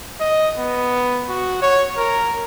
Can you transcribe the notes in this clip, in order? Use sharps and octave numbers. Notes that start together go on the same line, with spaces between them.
D#5
B3
F#4
C#5
A#4